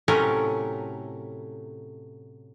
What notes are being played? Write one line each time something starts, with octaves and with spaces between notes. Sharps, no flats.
A2 C3 F#3 A3 C#4 A#4